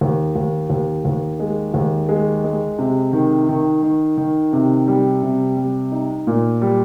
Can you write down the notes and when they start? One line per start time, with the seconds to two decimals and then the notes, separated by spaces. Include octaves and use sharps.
0.01 D#2
0.36 D#2
0.70 D#2
1.05 D#2
1.40 G#3
1.74 D#2
2.09 G#3
2.44 G#3
2.79 C3
3.13 D#3
3.49 D#3
3.83 D#3
4.18 D#3
4.53 C3
4.88 G3
5.23 C3
5.57 G3
5.92 D#4
6.27 A#2
6.61 G3